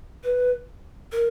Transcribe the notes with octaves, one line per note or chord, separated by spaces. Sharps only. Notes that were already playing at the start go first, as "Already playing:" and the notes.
B4
A#4